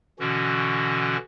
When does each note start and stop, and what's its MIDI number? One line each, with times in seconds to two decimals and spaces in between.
0.19 1.17 47
0.19 1.17 50
0.19 1.17 52
0.19 1.17 61
0.19 1.17 66